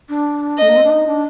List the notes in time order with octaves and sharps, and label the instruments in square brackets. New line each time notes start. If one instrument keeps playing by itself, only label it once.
[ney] D4
[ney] A3 [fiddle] D#5
[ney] A#3
C4
D4
D#4
D4